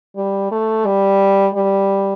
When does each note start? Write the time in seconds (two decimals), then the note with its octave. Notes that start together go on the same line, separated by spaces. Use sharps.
0.16 G3
0.52 A3
0.85 G3
1.55 G3